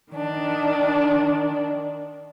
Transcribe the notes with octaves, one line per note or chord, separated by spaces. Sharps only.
D#3 D4